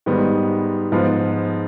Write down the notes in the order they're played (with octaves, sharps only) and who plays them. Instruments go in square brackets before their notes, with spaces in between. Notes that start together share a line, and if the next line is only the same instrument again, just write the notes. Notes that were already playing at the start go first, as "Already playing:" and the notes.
[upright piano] G#2 D#3 G3 B3
G#2 F3 B3 F4